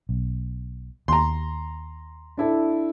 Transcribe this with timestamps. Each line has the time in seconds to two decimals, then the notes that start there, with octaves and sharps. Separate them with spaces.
0.09 B1
1.08 D#2 A#5 C6
2.37 D4 E4 A4